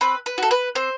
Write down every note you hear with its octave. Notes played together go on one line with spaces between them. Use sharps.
C4 B4
B4
F#4 A4
B4
C4 C5